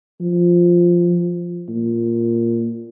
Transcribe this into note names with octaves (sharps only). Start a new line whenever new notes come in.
F3
A#2